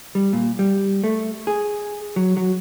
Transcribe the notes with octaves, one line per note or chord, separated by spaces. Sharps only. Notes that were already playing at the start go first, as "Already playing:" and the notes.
G3
A#2
G3
A3
G#4
F#3
F#3